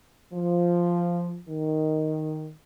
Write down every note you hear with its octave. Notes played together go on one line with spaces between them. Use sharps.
F3
D#3